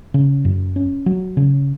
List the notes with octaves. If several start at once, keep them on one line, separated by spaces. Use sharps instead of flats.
C#3
F#2
C#4
F#3
C#3